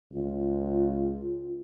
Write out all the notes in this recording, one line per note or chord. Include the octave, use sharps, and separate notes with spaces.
C#2 F4